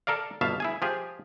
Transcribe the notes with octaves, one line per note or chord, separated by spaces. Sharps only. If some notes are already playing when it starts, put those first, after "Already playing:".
A4 A#4 D5 F5
G1 B2 E5 F5 A5
E4 G#4 G#5
F3 G4 G#4